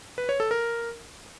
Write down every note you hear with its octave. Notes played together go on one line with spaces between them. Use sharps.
B4
C#5
A4
A#4